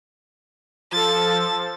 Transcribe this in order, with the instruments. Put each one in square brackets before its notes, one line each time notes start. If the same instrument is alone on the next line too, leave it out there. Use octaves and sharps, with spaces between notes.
[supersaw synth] F3 A4 [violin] A6